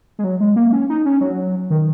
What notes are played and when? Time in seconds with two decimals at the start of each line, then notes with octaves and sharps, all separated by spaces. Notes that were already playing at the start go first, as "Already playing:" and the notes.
0.19 G#3
0.24 F#3
0.40 G#3
0.56 A#3
0.73 C#4
0.90 D#4
1.06 C#4
1.21 F#3
1.70 D#3